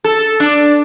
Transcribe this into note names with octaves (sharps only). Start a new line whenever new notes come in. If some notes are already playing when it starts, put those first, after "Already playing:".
A4
D4